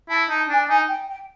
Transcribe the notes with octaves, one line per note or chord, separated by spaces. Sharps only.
E4 A5
D#4 A5
D4 G#5
D#4 G#5
G5
G5